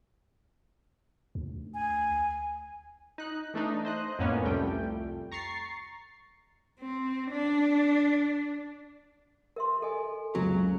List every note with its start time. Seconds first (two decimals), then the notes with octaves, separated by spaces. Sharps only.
1.35 D2
1.74 G#5
3.18 D#4 F#6
3.54 E3 A3 D4 D#4
3.85 C5 D#5 F#6
4.19 F2 A2 A#3 B3 C#4
4.44 C2 F2 G3 A3 G5
5.32 A#5 C#6 A6 C7
6.80 C4
7.31 D4
9.56 A#4 E5 C6
9.82 A4 D#5 G#5
10.35 F#1 C#2 F#3